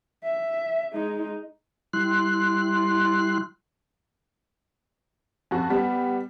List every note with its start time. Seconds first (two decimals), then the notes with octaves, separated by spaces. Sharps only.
0.24 E5
0.93 G#3 D#4
1.93 G3 E4 C6 F#6
5.51 F2 F#4
5.70 G3 B3